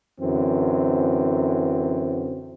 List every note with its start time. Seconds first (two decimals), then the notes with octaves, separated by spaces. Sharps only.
0.20 F#2 D3 E3 C4